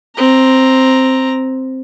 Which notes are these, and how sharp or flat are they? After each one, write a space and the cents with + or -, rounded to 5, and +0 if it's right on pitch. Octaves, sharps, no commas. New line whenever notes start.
C4 +0 A#5 +0